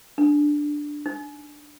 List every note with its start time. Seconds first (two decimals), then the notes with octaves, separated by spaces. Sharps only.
0.18 D4
1.06 D#4